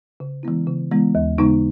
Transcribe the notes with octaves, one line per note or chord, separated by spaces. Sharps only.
C#3
E3 G#3 B3 E4
C#3
E3 G#3 B3 E4
D#2
C#3 G#3 B3 D#4